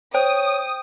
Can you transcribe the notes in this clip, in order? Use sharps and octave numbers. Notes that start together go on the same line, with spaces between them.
C5 C#5 G5 D#6